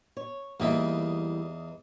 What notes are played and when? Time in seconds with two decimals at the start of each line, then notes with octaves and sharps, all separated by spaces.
0.17 C#5
0.60 E2 E3 G3 A#3 D#4 E5